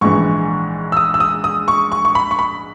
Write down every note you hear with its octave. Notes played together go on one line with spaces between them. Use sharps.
A#1 G#2 E3 G#3 C#6
E6
D#6
E6
D#6
D#6
C#6
C#6
C#6
B5
C#6
B5